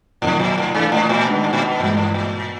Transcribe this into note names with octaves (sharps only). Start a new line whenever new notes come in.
F2 A2 C3 D#3 F#3
A#2
A2
G#2 E3 A3 D4
A2
A#2
B2 D#3 G#3 B3 D4
A2
A#2
B2
G2 A#2 E3 G#3
A2
A#2